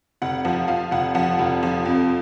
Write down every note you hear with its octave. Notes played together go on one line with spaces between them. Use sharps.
F1 F#5
F3 F#5
F3 F5
F1 F#5
F3 F#5
F1
F3
F2